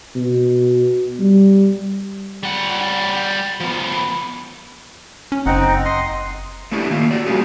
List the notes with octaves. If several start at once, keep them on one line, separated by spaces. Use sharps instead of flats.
B2
G3
G3 F#5
F3 B3
C#4
F#1 C4 D#4 F#5
D#5 C6
A3 B3 D4 E4 G4
D#3 A3 A#3 F4
F#4 D5
G3 A#3 C#4 F4 G4 G#4